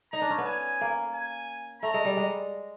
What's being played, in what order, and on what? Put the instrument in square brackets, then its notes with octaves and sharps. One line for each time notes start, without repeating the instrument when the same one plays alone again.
[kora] D#4 [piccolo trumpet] A#5
[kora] D4
C#4
B3
[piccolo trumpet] G#5
[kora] A#3
[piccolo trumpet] G#5
[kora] A3 [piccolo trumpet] A#5
[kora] G#3
G3
G#3